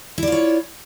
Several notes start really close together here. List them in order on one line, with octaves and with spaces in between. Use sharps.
E4 D5 F4 C#5